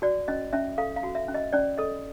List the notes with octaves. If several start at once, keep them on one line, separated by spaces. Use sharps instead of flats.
F#4 D5
C#4 D#5
C#4 E5
A4 F5
F5
F#4
E5
C#4
D#5
C#4 D5
A4 D#5